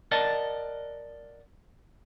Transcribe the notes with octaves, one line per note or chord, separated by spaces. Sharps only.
A#4 D5 D#5 F#5 A5